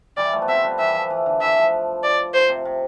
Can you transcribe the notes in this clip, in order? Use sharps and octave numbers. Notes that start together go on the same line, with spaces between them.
E3 G3 D5
F3 A3
B3
A3 C4 E5
G3 B3
E3 G3 E5
F3
E3
D3
E3 E5
F3
D5
C5
C3
C3